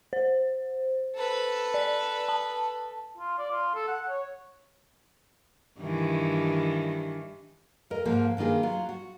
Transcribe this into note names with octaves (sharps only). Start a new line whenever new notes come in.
C5
A4 B4
D5
A5
F4
D5
F4
A4
F#5
C#5
G2 D#3 E3
F2 A#4 D#5
G#2 F3 A#3
G2 D#3 A#3 F4 G#4
F#3 F4
F#4